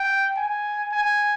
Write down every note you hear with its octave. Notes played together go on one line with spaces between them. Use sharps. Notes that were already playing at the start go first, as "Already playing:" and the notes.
Already playing: G5
G#5
G#5